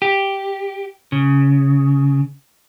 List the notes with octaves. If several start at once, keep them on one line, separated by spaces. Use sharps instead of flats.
G4
C#3